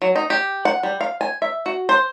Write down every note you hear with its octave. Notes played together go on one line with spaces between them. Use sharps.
F#3
D#4
G4
F#5
G3
F5
G#5
E5
F#4
C5